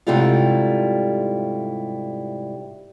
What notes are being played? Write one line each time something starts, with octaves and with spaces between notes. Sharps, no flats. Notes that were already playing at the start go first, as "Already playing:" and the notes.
G#2 C3 G3 A3 E4 F4